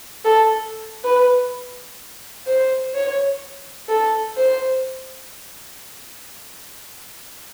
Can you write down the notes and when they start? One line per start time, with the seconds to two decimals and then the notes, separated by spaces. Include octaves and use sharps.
0.25 A4
1.04 B4
2.47 C5
2.94 C#5
3.89 A4
4.37 C5